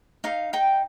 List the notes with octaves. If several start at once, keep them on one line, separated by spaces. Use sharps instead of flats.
D#4 F5
D#4 G5